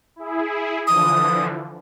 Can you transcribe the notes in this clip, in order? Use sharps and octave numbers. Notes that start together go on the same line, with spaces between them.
E4 G#4
D3 E3 F3 D#6